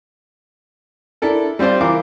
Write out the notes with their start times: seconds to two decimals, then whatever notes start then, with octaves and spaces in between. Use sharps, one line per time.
1.22 D4 E4 A4 A#4
1.59 G3 C4 F4 C5 D5
1.81 E3 A#4 F5 D6